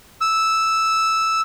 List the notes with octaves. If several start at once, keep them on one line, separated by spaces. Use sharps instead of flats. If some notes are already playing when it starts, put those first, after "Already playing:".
E6